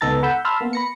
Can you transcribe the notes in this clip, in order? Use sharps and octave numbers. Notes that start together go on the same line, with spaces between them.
C#2 B3 D#4 A4 A#5 A6
F#5 B5 E6 G6
A5 B5 C6 E6 F6
A#3 B3
B5 A#6 C#7